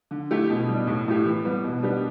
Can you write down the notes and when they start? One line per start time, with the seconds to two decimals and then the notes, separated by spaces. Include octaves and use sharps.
0.11 D3
0.31 A3 E4 G4
0.50 B2
0.69 G3 D4
0.87 A2
1.08 A3 E4 G4
1.25 E3
1.45 G3 B3
1.64 B2
1.83 G3 B3 D4 G4